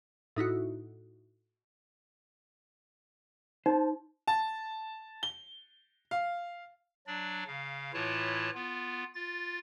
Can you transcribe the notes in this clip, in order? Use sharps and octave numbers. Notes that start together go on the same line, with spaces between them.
A2 D#4 E4 F#4
D#4 C5 A5
A5
G7
F5
F#3 D4 D5
C#3 F5
A2 E3 E4 F4 C#5 A5
B3 F4
F4 A6